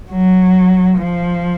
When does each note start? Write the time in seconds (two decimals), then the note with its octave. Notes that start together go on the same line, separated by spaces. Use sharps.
0.11 F#3
0.98 F3